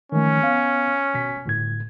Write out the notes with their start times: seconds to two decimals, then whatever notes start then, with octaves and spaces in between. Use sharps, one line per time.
0.12 D#3 F3 A3 C#4
0.42 B3 F5
1.14 G#1 B2 B6
1.46 G1 A2 G#6